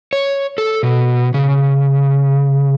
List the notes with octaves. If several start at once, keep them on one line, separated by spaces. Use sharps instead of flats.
C#5
A4
B2
C#3